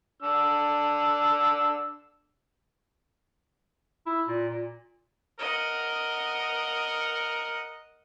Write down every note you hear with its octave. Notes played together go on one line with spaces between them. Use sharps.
D4 E6
E4
A#2
A#2
A#4 D#5 F#5